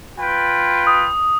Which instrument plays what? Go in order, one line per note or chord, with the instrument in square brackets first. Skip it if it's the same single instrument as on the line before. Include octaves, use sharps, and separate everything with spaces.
[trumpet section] F4 B4 G5
[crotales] D#6